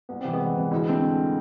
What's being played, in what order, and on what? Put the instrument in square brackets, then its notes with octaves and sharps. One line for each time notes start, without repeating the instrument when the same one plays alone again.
[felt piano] C2 [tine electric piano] B3
[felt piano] C3 E3 [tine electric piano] C4
[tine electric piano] G#3 B3
[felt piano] C2
C3 E3
[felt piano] D2 [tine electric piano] E3 G#3
[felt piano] D3 A3 C4